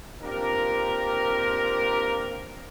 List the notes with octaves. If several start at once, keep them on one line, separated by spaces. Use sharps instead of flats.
A#3 C4 D4 F4 G4 A#4